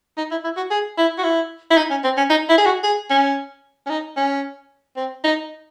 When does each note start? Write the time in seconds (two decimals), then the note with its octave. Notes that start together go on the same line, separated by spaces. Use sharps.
0.18 D#4
0.31 E4
0.44 E4
0.57 F#4
0.71 G#4
0.98 E4
1.18 F#4
1.24 E4
1.71 E4
1.77 D#4
1.90 C#4
2.04 C4
2.17 C#4
2.30 D#4
2.49 E4
2.58 G#4
2.66 F#4
2.83 G#4
3.10 C#4
3.86 C#4
3.90 D#4
4.17 C#4
4.96 C4
5.24 D#4